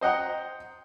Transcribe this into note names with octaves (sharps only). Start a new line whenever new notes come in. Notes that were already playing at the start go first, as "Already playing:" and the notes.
C5 D#5 F#5 G5 A#5